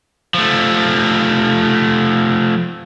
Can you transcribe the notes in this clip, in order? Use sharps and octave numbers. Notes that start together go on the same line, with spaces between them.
F3 A3